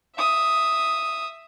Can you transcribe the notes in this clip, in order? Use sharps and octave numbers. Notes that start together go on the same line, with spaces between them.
E5 D#6